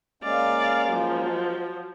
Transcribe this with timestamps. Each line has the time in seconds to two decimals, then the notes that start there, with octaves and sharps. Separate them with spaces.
0.23 G#3 A#3 C#4 D5 F5
0.89 F3 F#3